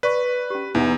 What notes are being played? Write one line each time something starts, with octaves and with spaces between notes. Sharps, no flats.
B4 D5 C#6
C#4 G4
E2 E3 B3 D#4 E4 F#5